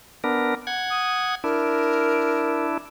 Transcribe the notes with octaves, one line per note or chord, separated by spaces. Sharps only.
B3 D4 A#4
F#5 G#6
D#6
D4 E4 A#4